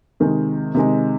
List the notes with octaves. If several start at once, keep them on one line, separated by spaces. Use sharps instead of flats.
C3 D#3 G#3
C3 D#3 G#3